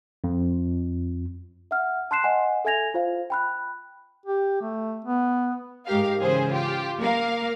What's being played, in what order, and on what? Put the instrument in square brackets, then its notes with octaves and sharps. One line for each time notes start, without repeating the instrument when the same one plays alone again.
[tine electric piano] F2
[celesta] E5 F#5 F6
A5 C6 F#6 C7 E7
D#5 F#5 G#5
A4 E5 G#5 G#6 A#6 F7
F4 C5 F5
G5 B5 F#6
[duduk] G4
A3
B3
[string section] G#2 G4 A#4 F5
C#3 E3 G#4 C5
F4 G4
A#3 A#4 F5